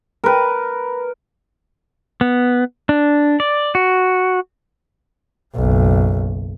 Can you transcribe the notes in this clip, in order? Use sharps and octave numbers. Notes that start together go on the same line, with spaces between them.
A#4 B4
B3
D4
D5
F#4
F#1 B1